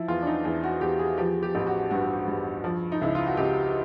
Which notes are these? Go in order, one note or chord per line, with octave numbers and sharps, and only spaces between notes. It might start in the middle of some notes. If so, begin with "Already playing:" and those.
Already playing: F3 E4
E2 F4
D4
D#4
E2 E4
F#4
E2 G4
G#4
F3 G4
G4
A1
F#4
G2 F#4
G2
F3
D#4
C#2 E4
F4
F#4
C#2 G4